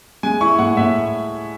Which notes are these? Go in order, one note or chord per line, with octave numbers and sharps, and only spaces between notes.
G#3 G#5
E4 C#6
A2 F#5
A2 E5